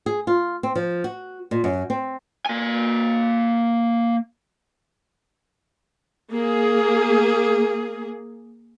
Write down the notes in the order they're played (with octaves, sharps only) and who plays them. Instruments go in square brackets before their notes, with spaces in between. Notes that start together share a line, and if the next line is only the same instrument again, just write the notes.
[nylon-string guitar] G#4
F4
C4
F3
F#4
A#2
F#2
C4
[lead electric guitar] A#3 G#5
[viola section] A#3 G#4